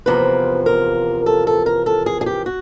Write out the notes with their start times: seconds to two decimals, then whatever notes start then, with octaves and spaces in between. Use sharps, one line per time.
0.06 E2 C3 F3 A#3 B4
0.66 A#4
1.26 A4
1.47 A4
1.66 A#4
1.86 A4
2.06 G#4
2.21 G#4
2.26 G4
2.46 F#4